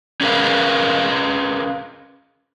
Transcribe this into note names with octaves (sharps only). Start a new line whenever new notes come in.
C#4 G#4 A#4 B4 F5